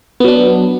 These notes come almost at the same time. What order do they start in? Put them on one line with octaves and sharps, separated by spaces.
B3 F#3 D4